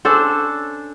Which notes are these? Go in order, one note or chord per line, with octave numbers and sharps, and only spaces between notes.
C#4 D4 A4 C5